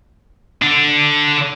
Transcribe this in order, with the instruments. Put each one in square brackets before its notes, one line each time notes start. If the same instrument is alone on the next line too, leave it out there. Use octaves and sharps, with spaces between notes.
[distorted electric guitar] D3 D4